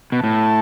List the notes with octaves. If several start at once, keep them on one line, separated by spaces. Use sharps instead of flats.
B2
A2 A5